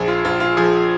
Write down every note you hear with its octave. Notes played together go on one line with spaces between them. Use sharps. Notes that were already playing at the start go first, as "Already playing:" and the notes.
Already playing: A#1 G#4
F4
A#1 F4
F4
F3 G#4